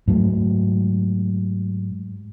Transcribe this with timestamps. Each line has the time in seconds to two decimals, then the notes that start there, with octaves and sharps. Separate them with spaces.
0.08 G#2 F#3 A3